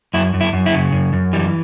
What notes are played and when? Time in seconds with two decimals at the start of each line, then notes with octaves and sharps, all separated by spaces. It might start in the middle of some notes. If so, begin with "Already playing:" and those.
0.14 F#2 E4
0.34 F#2
0.41 E4
0.53 F#2
0.66 E4
0.73 C#3
0.92 F#2
1.13 F#2
1.33 E3 G3